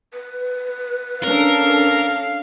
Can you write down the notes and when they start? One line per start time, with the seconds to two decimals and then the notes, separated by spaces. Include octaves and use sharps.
0.13 B4
1.24 C#4 D4 A4 A#4 F5